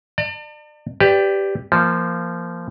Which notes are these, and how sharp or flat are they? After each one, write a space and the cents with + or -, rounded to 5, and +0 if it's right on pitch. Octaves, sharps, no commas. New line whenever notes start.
D5 +35 A5 +45
G4 +0 B4 +25 D5 +0
F3 -20 A#3 +0